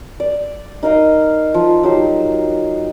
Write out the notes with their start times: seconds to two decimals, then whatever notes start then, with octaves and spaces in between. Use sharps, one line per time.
0.20 D5
0.83 D#4 A#4 D#5 F5
1.54 F3
1.83 F#3 D#4 G4 C5